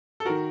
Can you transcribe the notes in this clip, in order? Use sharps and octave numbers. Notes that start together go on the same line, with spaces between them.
A4
D#3 F#4 A#4